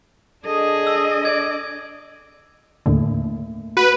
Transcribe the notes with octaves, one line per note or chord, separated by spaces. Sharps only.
D4 G#4 A4 D#5
E6
D5 G#6
D#2 A2 D3 A3 A#3
F#4 B4 D#7